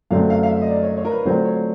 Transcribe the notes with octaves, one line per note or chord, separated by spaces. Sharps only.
F#2 D3 F#3 A3 C4 F5
F5
F5
E5
D#5
D5
C#5
C#5
A#4
B4
D3 F#3 A3 C4 F4 C5
C#5